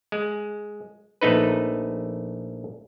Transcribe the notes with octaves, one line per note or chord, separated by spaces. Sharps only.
G#3
A#1 A3 D#4 B4